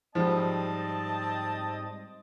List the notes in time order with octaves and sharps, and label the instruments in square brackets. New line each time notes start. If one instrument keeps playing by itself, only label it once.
[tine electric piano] G#2 G3 [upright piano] F3 [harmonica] C4 D#5 A5